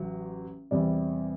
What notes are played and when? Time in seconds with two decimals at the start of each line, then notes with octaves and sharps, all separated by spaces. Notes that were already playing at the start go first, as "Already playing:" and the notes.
Already playing: A1 F#3
0.71 E2 C3 G3 D5